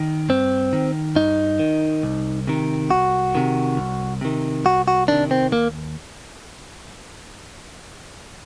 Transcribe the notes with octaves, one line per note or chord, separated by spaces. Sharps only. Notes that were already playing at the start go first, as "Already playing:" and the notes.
Already playing: D#3
G2 C4
D#3
G2 D#4
D#3
C2
C3 D#3
C2 F#4
C3 D#3
C2
C3 D#3
C2 F#4
F#4
C3 D#3 D4
C4
D#2 A#3